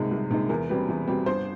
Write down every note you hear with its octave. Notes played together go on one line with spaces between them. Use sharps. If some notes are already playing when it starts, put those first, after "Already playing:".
Already playing: C2 C3 D#3 G#3
C2
C3 D#3 G#3
E2 A#4
B2 G3 C4 B4
E2
B2 G3 C4
G1 C5